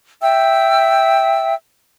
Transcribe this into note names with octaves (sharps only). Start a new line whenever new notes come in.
E5 G5 E6